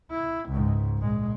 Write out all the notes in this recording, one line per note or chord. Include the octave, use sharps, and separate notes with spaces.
E4
C#2 G#2
A#1 G#3